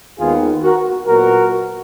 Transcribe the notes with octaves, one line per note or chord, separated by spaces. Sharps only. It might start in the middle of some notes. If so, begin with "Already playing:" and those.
D#2 D#3 G#3 B3 F4 G#4
F#4 A#4
A#2 F#3 B3 F#4 A#4